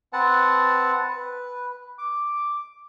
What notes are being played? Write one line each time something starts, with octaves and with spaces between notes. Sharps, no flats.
C4 B4 F#5 A5
B4
D6